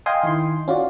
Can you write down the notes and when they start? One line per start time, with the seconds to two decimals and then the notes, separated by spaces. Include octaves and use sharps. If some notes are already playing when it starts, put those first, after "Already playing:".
0.06 D#5 F5 G5 G#5 C6 D#6
0.23 D#3 E4 C6
0.68 C#4 F4 F#4 D5